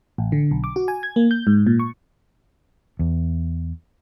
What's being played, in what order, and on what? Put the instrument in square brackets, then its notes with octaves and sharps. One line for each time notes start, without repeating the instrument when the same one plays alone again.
[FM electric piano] A1
D3
B1
D6
F#4
G#5
G#6
A#3
G6
G#2
A#2
C#6
[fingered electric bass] E2